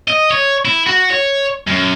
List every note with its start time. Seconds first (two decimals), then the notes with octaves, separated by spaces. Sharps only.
0.08 D#5
0.31 C#5
0.65 E4
0.86 F#4
1.10 C#5
1.68 F#2